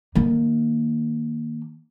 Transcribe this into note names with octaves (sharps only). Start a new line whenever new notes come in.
D#3 A#3